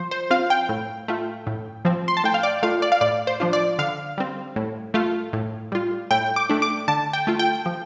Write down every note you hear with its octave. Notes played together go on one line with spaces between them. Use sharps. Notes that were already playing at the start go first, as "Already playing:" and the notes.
Already playing: F3 C5
C5
C4 F4 F5
G5
A2
A3 F4
A2
F3 C4
C6
A5
A2 G5
F5
D5
A3 F4 F5
D5
F5
A2 D5
C5
F3 D4 F4
D5
D3 F5
G3 C4
A2
A3 F4
A2
G3 F4
A2 G5
D6
A3 D4
D6
D3 A5
G5
A3 F4
G5
F3